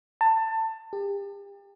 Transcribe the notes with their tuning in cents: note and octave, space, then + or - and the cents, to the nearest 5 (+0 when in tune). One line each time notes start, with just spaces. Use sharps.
A5 +20
G4 +35